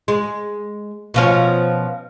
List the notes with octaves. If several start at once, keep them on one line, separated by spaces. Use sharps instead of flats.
G#3
B2 F3 C#4